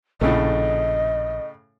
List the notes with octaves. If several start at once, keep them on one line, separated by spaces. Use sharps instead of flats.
A#1 A2 C#3 A3 D#5